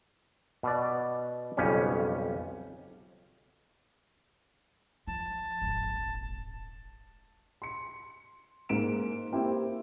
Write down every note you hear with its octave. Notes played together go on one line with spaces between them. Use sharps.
B2 B4 D5
B1 F2 C#3 G3 C#4
F3 A5
D#1 G#1
C6 C#7
G#2 A#3 D7 E7
A#3 C4 E4 G4